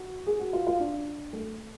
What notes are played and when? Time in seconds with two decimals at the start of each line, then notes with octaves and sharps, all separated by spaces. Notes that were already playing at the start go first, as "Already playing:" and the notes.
Already playing: F#4
0.27 G#4
0.39 F#4
0.53 F4
0.67 F4
0.80 D4
1.33 A3